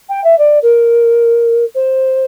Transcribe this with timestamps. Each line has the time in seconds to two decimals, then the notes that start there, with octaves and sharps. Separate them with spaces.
0.09 G5
0.24 E5
0.38 D5
0.62 A#4
1.75 C5